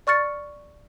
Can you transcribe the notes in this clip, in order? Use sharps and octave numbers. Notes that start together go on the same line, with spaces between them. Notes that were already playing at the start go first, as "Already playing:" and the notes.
D5 C#6 F6 A6 C#7